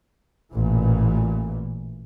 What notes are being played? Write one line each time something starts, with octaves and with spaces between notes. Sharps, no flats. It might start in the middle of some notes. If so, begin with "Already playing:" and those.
A1 A#2 E3